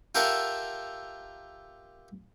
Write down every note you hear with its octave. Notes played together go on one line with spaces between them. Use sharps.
F4 G4 A4 A#4 E5 F#5